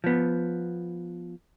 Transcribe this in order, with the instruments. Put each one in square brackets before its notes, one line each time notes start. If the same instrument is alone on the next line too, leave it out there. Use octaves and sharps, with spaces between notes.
[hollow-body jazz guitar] F3 B3